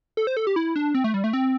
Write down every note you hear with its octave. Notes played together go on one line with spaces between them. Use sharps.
A4
C5
A4
G4
E4
D4
C4
A3
G3
A3
C4